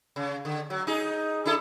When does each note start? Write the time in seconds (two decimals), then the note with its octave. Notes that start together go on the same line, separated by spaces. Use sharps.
0.16 C#3
0.45 D3
0.70 F#3
0.87 D#4 G#4
1.46 D4 E4 A4